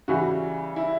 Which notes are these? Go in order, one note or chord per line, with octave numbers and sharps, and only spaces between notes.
C#3 E3 G3 F#4
E4